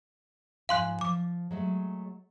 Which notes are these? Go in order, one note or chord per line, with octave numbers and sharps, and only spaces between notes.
G#2 F3 F5 G#5 C6 F#6
F3 D6
F#3 G#3 A3